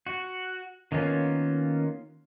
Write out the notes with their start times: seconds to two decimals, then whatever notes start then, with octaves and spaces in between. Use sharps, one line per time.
0.07 F#4
0.92 D#3 A#3 B3 C#4 F4